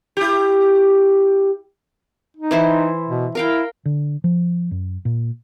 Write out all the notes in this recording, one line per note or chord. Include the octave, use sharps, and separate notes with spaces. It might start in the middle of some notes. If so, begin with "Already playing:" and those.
E4 G4
D#4
E3 E4 C5
B2
E4 A#4 F5 G5
D3
F3
F#2
A#2